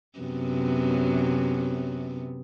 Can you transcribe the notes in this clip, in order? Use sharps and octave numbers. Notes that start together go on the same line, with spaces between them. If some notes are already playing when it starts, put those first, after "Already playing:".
F#2 C3 B3